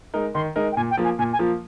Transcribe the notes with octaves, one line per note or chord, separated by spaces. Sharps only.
G#3 D#4 A#4
D#3 C6
G#3 D#4 A#4
G5
A#2 G#5
G5
F3 A#3 F4
G#5
A#2 G#5
G#5
F3 A#3 F4